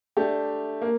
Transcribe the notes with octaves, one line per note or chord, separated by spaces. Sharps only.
A3 D4 G4
A#3